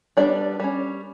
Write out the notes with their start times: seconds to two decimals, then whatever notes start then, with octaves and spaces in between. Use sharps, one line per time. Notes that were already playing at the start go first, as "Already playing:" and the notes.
0.17 G3 B3 D4 D5
0.60 G3 C#4